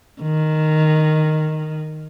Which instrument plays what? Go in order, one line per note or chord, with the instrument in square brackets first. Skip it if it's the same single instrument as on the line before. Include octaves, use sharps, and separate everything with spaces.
[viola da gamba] D#3